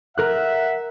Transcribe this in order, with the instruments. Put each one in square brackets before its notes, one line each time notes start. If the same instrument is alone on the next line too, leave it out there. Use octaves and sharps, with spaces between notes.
[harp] A#4 F#6 [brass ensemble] E5 F#5